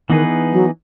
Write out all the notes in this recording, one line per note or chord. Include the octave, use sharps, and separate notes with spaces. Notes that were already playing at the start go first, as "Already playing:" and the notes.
D#3 E3 B3 D#4 G#4 B4
F#3